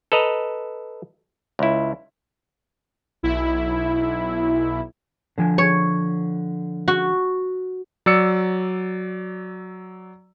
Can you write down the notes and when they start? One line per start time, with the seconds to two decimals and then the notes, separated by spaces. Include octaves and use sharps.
0.12 A4 B4 D#5 A#5
1.59 C#2 E4
3.23 B1 E4
5.38 D3 F3 G#5
5.58 C#5
6.88 F#4
8.06 F#3 D5 E6 C#7